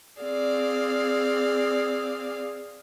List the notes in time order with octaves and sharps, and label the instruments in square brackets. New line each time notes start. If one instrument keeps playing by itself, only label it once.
[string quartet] C4 G#4 D5 F5